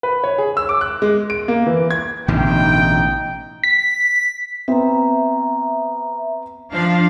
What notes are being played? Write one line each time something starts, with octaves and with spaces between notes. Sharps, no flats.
B4
C#5
G#4
E6
D6
F#6
G#3
D7
A#3
E3
G#6
A1 B2 D3 D#4 G5
B6
B3 C4 E5 A#5
F3 D4 F5